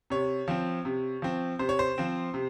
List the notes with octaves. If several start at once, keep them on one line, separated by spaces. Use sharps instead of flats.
C3 C#5
F3 C4
C3
F3 C4
C3 C5
C#5
C5
F3 C4
C3